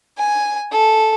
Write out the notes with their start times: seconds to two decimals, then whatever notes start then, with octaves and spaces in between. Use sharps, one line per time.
0.18 G#5
0.72 A4